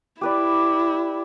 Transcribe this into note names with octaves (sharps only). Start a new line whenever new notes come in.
E4 G4 B4 D5